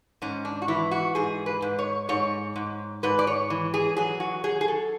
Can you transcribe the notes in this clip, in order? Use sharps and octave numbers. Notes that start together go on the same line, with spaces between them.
G#2 C#4
D4
F#4
E3 E4
F#4
G#2 G#4
B4
G#2
C#5
G#2 C#5
G#2
G#2 B4
D5
C#5
E3
G#4
F#3 G#4
F#4
F#3 G#4
G#4
A4